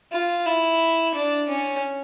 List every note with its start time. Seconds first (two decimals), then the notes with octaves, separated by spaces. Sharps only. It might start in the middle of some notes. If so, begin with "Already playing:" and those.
0.12 F4
0.46 E4
1.15 D4
1.48 C#4